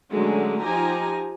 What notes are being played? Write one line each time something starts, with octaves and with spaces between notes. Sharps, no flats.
D3 F#3 G#3 A3 C#4
F3 D#4 G4 G#5 A#5